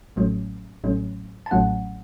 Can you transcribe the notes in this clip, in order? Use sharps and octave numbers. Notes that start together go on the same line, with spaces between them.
A1 A2 F#3 A3 C#4
A1 A2 F#3 A3 C#4
A5
A1 A2 F#3 A3 C#4 F#5